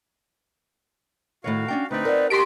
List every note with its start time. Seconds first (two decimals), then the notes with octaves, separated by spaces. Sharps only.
1.44 A2 D#3 F#4 C#5 F5
1.68 C#4 D4 G5
1.91 D2 C4 D4 D#4 B4
2.05 A#4 D5 F#5
2.30 F#4 G4 D#5 A5 C6 B6 D7